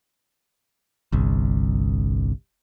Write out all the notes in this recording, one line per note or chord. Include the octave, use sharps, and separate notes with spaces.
G1 C2